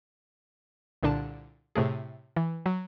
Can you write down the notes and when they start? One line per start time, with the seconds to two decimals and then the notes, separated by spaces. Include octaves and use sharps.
1.03 C2 A#2 D3 D4 A5
1.75 A2 C3 A3 G#4
2.37 E3
2.66 F#3